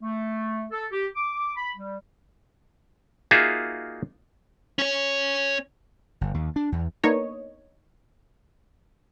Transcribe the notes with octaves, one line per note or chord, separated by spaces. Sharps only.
A3
A4
G4
D6
B5
G3
A#3 D#4 F4 F#4 G#4 E5
C#4 C#5
G1
D#2
D4
E2
A#3 B3 D4 D#4 C#5 D#5